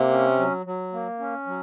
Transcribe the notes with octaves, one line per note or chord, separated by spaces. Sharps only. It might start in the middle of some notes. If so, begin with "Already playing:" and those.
Already playing: C3 A#3
C#4
F#3
F#3
A#3
C#4
F#3